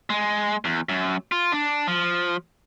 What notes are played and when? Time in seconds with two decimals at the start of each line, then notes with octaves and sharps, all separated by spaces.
0.10 G#3
0.65 E2
0.89 F#2
1.32 F4
1.52 D4
1.87 F3